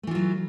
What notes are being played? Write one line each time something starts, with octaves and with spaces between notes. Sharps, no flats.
E3 F#3 A3 F4